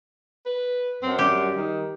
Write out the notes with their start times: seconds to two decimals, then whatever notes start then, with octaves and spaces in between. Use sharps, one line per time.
0.46 B4
1.03 F#2 C4
1.19 G3 G4
1.55 D#3